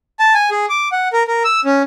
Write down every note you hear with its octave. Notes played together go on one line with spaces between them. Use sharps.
A5
G#5
G#4
D6
F#5
A#4
A#4
E6
C#4